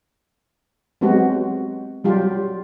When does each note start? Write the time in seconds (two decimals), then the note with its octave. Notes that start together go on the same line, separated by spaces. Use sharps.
1.01 F#3 G#3 B3 C4 F#4 G4
2.04 F#3 G3 F4 G4